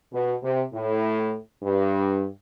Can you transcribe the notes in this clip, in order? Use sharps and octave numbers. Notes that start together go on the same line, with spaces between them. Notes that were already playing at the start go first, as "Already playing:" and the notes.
B2
C3
A2
G2